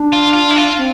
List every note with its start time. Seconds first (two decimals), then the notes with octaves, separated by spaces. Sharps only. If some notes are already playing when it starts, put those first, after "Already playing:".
Already playing: D4
0.12 F4
0.34 F4
0.51 E4
0.56 F4
0.78 C4